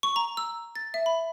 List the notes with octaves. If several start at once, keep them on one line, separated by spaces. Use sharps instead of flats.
C#6
A#5
E6
A6
E5
B5